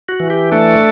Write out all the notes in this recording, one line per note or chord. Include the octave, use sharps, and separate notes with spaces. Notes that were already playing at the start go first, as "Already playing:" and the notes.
F#4
E3
G4
A3 D4 A4